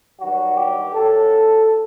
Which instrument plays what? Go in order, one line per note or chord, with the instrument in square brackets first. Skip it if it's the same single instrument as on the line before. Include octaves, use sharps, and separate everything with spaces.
[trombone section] G2 D#3 F#3 F#4
G4
F#2 F#3 A4